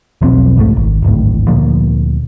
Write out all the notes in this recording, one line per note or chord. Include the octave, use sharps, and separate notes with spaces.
E1 B1 F3 C4
F#1 C2 G#2 A3
G#1
D1 G#1 A2
D2 A#2 F3 A#3